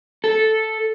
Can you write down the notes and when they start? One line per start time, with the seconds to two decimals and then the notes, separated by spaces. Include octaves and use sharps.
0.24 A4